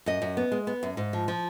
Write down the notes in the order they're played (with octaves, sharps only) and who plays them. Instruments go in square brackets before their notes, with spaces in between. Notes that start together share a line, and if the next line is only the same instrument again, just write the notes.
[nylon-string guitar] F#2 D#5
F#2
B3
G#3
B3
F#2
G#2
F3
F3